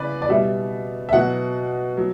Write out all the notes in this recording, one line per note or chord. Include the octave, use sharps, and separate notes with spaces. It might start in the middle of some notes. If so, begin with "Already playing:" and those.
Already playing: C#3 B4 D5
D5
B2 G3 E5
E5
B2 F#3 F#5
F#3